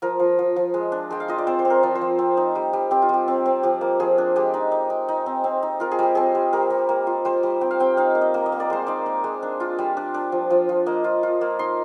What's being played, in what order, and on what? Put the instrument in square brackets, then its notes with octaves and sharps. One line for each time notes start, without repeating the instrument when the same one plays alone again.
[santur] F3 A#4
F3
F3
F3
G#3
D4
G#3 G5
F5
F4 D#5
D5
C4 C5
C5
C4
A#4
F3
C5
F3
C4
D#4
G3
G3
C4 G4
F4
G3 G4
C4
C4
F3 G4
A#3
F3 G#4
D4
G#3 G4
D#4
D#4
D#4
D#4
C4
C4
D#4
F4 A#4
G#4
G3 G4
C4 G#4
G3
G3 A#4
G3
A#3
F4
G3 C5
G3
C4 G5
F5
C4 G5
D#4 F5
A#3
D#5
A#3
D#5
A#3
D5
G#3 C5
D#4 D5
D#4
G#3
D4
F4
G3
D4
D4 D5
F3
F3
F3
A#3 D#5
F4
F4
A#3
D#4 C6